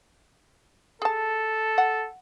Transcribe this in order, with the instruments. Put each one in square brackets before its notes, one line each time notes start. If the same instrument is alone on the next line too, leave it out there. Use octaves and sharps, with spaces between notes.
[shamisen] G#4 A5 [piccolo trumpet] A4
[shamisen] F#5